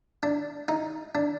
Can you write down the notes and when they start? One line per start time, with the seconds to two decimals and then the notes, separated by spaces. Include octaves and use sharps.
0.23 D4
0.68 D#4
1.15 D4